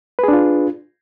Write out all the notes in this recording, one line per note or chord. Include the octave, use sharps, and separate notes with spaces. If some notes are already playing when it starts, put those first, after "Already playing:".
D4 F4 G#4 B4